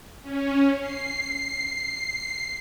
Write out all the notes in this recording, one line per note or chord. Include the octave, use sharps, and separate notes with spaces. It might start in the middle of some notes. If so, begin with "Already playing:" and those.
C#4
C7